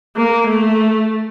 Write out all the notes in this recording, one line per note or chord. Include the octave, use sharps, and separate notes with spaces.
A#3
A3